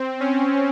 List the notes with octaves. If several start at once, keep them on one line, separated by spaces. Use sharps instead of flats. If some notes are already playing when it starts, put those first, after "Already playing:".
Already playing: C4
C#4